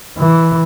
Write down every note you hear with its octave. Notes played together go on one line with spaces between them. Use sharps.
E3